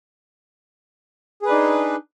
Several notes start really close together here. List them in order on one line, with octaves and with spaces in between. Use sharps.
G#4 B4 D4 D#4